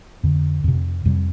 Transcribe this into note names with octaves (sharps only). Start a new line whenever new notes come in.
F2 D3
F2 C3
F2 C3 G3